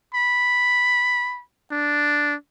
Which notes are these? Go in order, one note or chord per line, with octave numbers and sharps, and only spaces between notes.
B5
D4